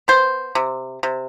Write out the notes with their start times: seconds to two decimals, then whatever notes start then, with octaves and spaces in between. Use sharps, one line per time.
0.08 B3 C5
0.55 C3
1.03 C3